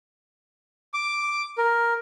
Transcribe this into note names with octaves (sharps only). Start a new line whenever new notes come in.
D6
A#4